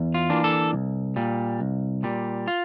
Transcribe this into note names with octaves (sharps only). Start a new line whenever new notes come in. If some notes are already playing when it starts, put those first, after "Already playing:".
Already playing: E2
F4
E3 A#3 D4
A4
C2
A#2 G3
C2
A#2 G3
F4